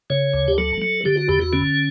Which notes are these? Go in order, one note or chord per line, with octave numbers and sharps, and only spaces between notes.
C#3 C#5
D2
G4
F#3 A4
F#3
D3 G4
F#4
E2 G4
F#4
D3 C#4